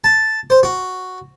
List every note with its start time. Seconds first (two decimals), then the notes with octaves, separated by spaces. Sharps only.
0.04 A5
0.50 C5
0.63 F#4